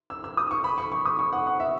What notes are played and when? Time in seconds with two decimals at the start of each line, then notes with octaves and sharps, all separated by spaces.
0.10 E6
0.24 E6
0.37 D#6
0.51 C#6
0.64 B5
0.78 C#6
0.92 C#6
1.05 D#6
1.19 C#6
1.33 F#5
1.47 F#5
1.60 E5